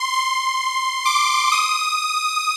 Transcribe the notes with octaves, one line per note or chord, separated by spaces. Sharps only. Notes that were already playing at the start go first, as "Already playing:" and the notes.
Already playing: C6
C6
D6
D#6